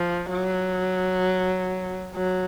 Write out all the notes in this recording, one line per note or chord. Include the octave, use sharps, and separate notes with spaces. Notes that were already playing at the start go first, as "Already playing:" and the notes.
Already playing: F3
F#3
F#3